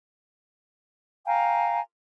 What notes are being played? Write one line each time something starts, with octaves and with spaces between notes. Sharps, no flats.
F5 G5 G#5 A#5